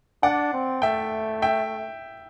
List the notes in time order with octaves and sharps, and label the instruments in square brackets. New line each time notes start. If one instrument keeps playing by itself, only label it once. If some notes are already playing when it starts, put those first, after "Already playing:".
[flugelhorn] D4 [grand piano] D5 F#5
[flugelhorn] C4
[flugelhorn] A3 [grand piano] E5 G5
[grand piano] E5 G5